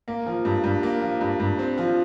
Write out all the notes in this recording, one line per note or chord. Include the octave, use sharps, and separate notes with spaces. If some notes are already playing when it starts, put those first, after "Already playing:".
A#3
F3
G2
G2
A#3
F3
G2
G2
C4
F3